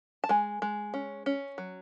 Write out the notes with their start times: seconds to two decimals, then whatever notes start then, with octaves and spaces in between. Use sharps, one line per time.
0.24 A5
0.29 G#3 G#5
0.62 G#3
0.94 C#4
1.26 C#4
1.58 F#3